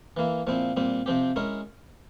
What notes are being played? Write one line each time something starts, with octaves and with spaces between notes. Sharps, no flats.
E3 A#3 E4
A#2 F3 C4 E4
A#2 G3 C4
C3 F3 C4 G4
G#3 C#4 E4 A#4